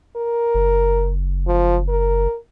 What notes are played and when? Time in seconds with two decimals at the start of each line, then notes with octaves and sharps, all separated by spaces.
0.16 A#4
0.55 F#1
1.47 F3
1.89 A#4